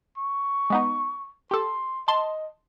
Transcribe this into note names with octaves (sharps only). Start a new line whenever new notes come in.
C#6
G#3 B3 D#4
G4 A4 C6
D#5 A5 C6